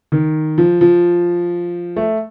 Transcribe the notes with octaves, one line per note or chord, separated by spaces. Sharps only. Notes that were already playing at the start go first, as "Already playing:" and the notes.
D#3
F3
F3
A3